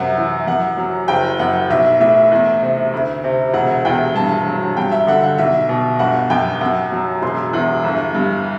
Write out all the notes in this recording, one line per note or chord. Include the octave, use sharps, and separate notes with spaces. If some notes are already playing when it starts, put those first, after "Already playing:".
Already playing: F#2 C3 F#5
E3
F#2 F#5
F#3
F#1 G5
F#2 F#5
B1 E5
A2 E5
E2
C3
D2
C3
E1 F#5
E2 G5
G2 A5
F#3
G2 G5
E5
D3 F#5
F#5
B1 E5
B2
G1 F#5
F#2 G5
F#2 F#5
F#3
E1 C6
E2
G1
G2